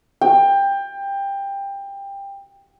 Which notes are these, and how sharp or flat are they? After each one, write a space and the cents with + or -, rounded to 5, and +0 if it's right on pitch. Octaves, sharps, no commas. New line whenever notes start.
G5 +20